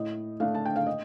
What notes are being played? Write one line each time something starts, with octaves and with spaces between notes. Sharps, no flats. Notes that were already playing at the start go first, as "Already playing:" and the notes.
Already playing: A2 D#5
A3 D4 F5
A5
G5
F5
D#5